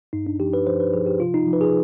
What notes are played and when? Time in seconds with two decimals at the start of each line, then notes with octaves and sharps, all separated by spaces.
0.13 G2 D#4
0.27 D4
0.40 F3 G4
0.53 B4
0.67 F3 C5
0.80 B4
0.93 F3 G#4
1.07 G4
1.20 C3 F4
1.34 D#4
1.47 F3
1.53 B4
1.61 G#4